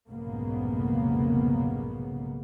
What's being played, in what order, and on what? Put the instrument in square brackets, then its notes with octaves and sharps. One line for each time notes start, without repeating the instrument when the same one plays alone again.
[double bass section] F1 B1 G#2 C#3 A#3 B3